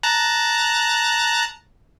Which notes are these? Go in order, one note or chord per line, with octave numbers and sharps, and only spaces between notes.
A5 A#5 F#6